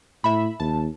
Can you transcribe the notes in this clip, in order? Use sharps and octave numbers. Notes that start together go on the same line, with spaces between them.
A2 E5 B5
D#2 A5